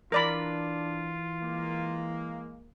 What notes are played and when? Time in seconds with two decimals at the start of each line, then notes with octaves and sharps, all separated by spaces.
0.12 E3 D4 F4 A#4 D5 B5
1.43 G#3 A#3